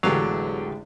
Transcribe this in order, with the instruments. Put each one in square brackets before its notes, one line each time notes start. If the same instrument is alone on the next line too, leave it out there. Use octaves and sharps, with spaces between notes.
[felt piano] A1 G#3 G4 [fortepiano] E2 D3 D4 [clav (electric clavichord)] F#3 F5